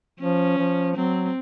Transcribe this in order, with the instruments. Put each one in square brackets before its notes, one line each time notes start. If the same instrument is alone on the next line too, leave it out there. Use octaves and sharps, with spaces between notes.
[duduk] F3 [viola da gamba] C#4
[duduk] F3
[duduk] F#3 [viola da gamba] C4